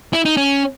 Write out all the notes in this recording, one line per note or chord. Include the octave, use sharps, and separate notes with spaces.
E4
D#4
C#4